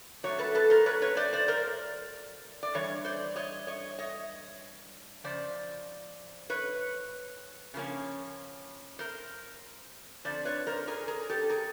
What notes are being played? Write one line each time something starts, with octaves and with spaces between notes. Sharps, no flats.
A#2 F#3 A3 C#5
A4 B4
A4 B4
A#4 C5
B4 C#5
B4 C#5
C5 D5
C5 D5
A#4 C5
D5
G2 E3 C#5
C5 D5
C#5 D#5
C#5 D#5
C#5 D#5
C#3 F3 C5 D5
B4 C#5
C#3 F3 A#3 C#4
A#4 C5
F2 D3 F3 C5 D5
B4 C#5
A#4 C5
G#4 A#4
G#4 A#4
G4 A4
G#4 A#4